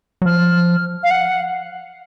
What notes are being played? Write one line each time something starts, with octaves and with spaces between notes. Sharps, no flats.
F#3
F3 F6
F5
F#5